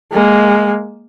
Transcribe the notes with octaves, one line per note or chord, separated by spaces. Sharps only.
G#3 A#3